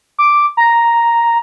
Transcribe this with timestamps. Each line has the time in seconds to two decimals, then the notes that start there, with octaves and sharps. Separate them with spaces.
0.19 D6
0.57 A#5